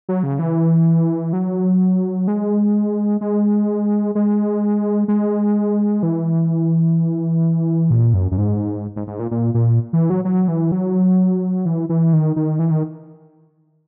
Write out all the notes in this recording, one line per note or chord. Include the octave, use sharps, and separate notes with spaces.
F#3
C#3
E3
F#3
G#3
G#3
G#3
G#3
E3
A#2
F#2
F#2
G#2
G#2
G#2
A#2
A#2
A#2
E3
F#3
F#3
E3
F#3
E3
E3
D#3
D#3
E3
D#3